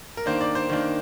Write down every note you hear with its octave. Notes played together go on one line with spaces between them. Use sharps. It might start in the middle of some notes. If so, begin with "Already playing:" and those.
A#4
D#3 A#3 D4 C5
D5
C5
D#3 A#3 D4